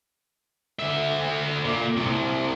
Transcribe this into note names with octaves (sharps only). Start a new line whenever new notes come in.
D3 E5
A#2
C2 C3